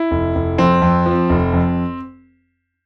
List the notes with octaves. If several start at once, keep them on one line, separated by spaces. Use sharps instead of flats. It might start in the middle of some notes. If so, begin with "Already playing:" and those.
Already playing: E4
F1
F1
F2 C4
F2
F3
F1
F2